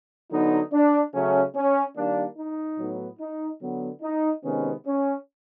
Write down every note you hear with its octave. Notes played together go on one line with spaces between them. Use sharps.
D3 F#3 B3 D#4
D4
C#3 F#3 A3 C#4
C#4
D#3 G3 A#3 D4
D#4
A2 F#3 B3
D#4
D3 F#3 B3
D#4
C3 D#3 G#3 B3 C#4
C#4